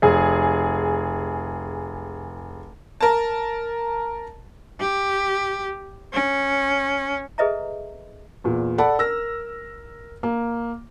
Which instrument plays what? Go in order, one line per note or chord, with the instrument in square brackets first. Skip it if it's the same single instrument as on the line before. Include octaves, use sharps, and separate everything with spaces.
[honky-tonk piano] F1 G#4
A#4 A5
[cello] G4
C#4
[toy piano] G#4 A4 B4 D#5 E5 A#5
[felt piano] E2 A#2
A4 D5 F#5 A5 B5
A#4 E6 F6 A#6
A#3